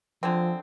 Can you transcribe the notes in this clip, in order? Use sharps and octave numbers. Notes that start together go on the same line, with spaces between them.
D3 F3 G#3 C4